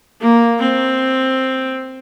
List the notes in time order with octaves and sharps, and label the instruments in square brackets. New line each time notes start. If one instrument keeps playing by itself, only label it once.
[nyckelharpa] A#3
C4